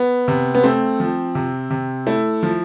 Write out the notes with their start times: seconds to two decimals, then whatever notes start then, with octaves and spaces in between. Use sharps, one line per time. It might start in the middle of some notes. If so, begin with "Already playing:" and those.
Already playing: B3
0.28 C3
0.55 B3
0.63 A3 C4
1.00 F3
1.35 C3
1.70 C3
2.07 A3 E4
2.43 F3